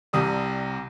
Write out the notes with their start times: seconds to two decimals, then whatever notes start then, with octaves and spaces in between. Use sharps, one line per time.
0.13 C2 C3 G3 D#6